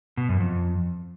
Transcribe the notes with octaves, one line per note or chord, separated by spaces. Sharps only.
B2
F#2
F2